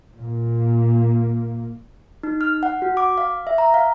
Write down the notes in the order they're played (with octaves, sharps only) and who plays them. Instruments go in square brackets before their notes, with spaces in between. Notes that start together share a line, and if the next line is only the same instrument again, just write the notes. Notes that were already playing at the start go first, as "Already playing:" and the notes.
[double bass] A#2 A#3
[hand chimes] D#4
F6
F#5
F#4
D6
F5
E5
A#5
F5